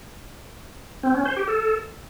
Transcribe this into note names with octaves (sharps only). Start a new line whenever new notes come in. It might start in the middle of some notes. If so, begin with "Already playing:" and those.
C4
C#4
C5
G4
A4